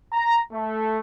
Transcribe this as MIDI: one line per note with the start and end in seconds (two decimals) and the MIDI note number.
0.12 0.37 82
0.51 0.97 57